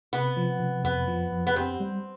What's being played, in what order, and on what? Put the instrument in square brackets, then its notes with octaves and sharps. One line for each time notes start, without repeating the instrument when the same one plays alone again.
[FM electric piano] C3 [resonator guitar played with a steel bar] B3
[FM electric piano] F3
C3
[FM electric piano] F2 [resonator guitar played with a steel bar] B3
[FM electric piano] F3
F2
[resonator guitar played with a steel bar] B3
[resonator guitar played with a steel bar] C4 [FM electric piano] G4
[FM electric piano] G3